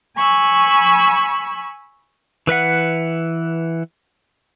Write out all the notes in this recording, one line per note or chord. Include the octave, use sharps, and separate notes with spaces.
G#5 B5 C#6 E6
E3 B4 E5 F#5